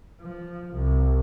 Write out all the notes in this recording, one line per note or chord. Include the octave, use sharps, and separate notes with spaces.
F3
C2